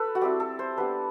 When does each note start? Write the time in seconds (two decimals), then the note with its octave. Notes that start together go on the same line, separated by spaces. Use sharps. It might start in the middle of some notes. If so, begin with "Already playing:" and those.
Already playing: A4 B4
0.15 F#4
0.21 G3 C4 E4 G4
0.40 A4
0.59 C5
0.77 G3 B3 D4 B4